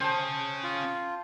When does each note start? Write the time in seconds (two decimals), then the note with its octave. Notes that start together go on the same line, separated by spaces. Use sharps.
0.01 C#4 G#4 C5 G5 A5
0.63 F4